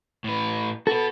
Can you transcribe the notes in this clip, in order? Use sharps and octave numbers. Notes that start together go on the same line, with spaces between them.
A2 B4
F#4 A4 B4